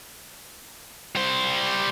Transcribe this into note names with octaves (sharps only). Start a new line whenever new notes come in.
G3 C5